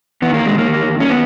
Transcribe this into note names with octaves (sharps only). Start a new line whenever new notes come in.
E2 D#3 B3
A#3
G#3
A#3
C#4
B3